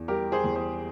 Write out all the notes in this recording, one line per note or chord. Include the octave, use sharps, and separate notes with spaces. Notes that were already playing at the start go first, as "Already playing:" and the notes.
Already playing: E2 E3
G3 G4 A#4
G#4 C5
E2
G#4 C5